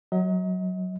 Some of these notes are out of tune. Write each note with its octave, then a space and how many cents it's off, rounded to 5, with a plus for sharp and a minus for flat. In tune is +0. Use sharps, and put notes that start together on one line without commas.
F#3 +0 D#5 +40